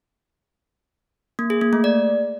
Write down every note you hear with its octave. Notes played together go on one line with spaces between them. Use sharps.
A#3
G#4
A#3
A3
D5